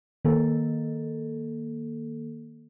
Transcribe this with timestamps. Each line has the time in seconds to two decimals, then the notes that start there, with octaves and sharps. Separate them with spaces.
0.25 D#3 A#3 A4